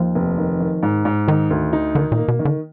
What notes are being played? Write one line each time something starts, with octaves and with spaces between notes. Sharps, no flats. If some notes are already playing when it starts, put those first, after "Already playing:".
Already playing: D#2 F3
F1
D#3
D#3
G#2
G#2
D#3 D#4
D2
D#4
D3 D#3
A#2
A#3
B2
D#3
D3